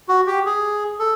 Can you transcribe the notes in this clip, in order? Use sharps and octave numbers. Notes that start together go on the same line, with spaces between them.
F#4
G4
G#4
A4